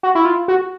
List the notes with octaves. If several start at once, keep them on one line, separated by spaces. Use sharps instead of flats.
F#4
E4
F4
F#4